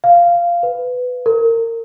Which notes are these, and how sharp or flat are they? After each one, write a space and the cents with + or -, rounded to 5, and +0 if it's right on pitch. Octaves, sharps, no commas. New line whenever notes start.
F5 -10
B4 +15
A#4 -30